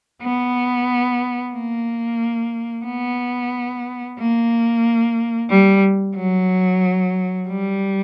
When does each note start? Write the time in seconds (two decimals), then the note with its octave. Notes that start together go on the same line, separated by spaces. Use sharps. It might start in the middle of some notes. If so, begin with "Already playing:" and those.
0.23 B3
1.55 A#3
2.86 B3
4.19 A#3
5.50 G3
6.16 F#3
7.49 G3